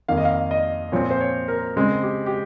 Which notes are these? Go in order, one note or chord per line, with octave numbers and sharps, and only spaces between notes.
F2 D#3 A#3 F5
D#5
F5
D#5
A#2 F3 C4 C#5
C5
C#5
A#4
C#3 G#3 C4
G4
G4